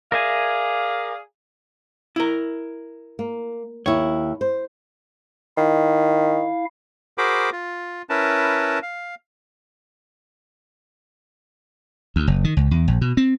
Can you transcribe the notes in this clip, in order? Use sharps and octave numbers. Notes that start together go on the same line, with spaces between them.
G#4 A#4 D5 E5 F5 G#5
E4 A#4
A#3
D#2 E4 C#5
C5
D#3 E4 F5
F#4 G#4 A#4 C5 B5 D6
F4
C#4 E4 A#4 B4 A5
F5
D2
F#1
D#3
C#2
E2
A#1
B2
C4